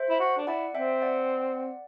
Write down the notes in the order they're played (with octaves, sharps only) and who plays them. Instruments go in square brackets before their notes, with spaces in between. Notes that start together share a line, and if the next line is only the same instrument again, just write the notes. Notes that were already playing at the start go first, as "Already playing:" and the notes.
Already playing: [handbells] C5 E5
[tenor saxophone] E4
F#4
D4
[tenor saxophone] E4 [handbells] D5 F#5
[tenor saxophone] C4 [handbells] E5 G5
[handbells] D5 F#5